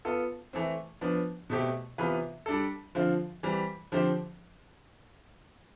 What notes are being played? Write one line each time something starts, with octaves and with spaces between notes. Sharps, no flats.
B3 F4 A4
E3 A3 C4
F3 B3 D4
B2 A3 C4 G4
C3 E3 B3 F4 B4
G3 D4 A4
D3 F3 C4 F4
E3 G3 C4
D3 F3 C4 G4 C5